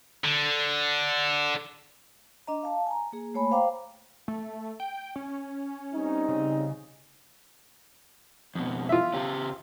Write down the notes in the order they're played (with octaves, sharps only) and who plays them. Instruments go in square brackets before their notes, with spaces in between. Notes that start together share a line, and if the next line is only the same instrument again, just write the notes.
[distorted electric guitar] D3
[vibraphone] D4 D#5 A#5
F5 A5
G#5 A#5
A#3 G#4
A3 A#3 C#5 G#5 B5
C5 F5 G5 A#5 D6
[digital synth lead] A3
G5
C#4
[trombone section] G3 C4 D#4
[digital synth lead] C#3
[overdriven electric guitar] F2 B2
[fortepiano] F4 E5
[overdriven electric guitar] C#3 G4